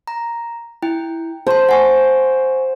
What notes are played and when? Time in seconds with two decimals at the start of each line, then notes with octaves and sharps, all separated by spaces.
0.07 A#5
0.83 E4 G5
1.47 C5 A5 C6
1.69 F#5 G#5 C#6